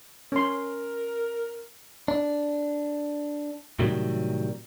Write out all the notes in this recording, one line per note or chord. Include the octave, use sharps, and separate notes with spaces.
C#4 A#4 C6
D4
A2 C3 D#3 F#3 G3